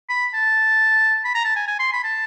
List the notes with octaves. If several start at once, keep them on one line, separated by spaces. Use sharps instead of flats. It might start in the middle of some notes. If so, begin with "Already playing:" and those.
B5
A5
B5
A#5
A5
G#5
G#5
C6
B5
A5